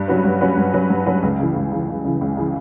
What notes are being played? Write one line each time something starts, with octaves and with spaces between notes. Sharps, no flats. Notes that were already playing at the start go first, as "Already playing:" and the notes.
Already playing: G2
F#3 C#4 F#4 B4
G2
F#3 C#4 F#4 B4
G2
F#3 C#4 F#4 B4
G2
F#3 C#4 F#4 B4
C#2
C#3 E3
C#2
C#3 E3
C#2
C#3 E3
C#2
C#3 E3